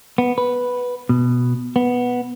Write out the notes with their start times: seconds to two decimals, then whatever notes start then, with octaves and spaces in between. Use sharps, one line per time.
0.18 B3
0.38 B4
1.09 B2
1.76 B3